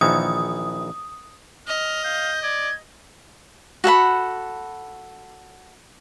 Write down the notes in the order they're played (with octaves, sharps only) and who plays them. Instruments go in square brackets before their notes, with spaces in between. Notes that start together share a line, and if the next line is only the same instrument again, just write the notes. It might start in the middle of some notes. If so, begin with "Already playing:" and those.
[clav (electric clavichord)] A#1 D#3 E3 [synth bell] D#6
[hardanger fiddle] D#5 [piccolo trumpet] F6
[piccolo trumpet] F5 [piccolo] G6
[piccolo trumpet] D5 [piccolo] G#6
[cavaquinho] F#4 A4 F#5 B5